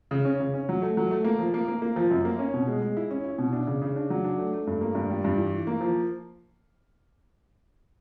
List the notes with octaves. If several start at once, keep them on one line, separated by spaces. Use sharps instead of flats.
C#3
C#4
C#3
C#4
F#3
A3
F#3
A3
A#3
F3
A#3
A#3
A#3
F3
F#2
A#3
C#4
B2
G#3
G#3
E4
C#4
E4
B2
D4
C#3
C#3
D4
F#3
D4
A3
A3
G2
A#3
G2
G3
G2
E3
E3
A#3
F3